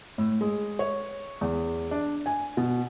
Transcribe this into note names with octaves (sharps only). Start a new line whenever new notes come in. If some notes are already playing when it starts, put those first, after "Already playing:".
A2
G#3
C#5
E2
D4
G#5
B2